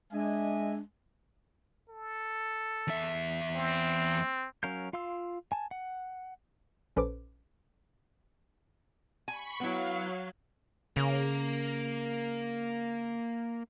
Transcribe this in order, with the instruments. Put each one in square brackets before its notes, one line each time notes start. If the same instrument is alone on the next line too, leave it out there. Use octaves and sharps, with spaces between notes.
[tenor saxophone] G#3 [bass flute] D4 [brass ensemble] D#5 E5 G#5
[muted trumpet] A4
[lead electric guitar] E2 E5
[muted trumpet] C4
[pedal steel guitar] F#3 C#4 A#4 F5 G6
F4 F5 C6 E6
G#5 A5
F#5
[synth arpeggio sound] A#1 C#4 A4 B4 C5 D6
[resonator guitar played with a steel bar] G#5 [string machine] B5 C#6 B6
[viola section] F#3 [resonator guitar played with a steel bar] B3 E4 [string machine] F5
[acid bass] C#3 [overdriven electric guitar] A#3